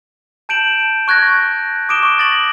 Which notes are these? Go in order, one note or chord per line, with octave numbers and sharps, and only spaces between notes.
A5 G6 D7 E7 F#7
C#6 F#6 G#6 A#6
F#6
D6 D#6 D7 E7 G7
C#6
A6 A#6 F#7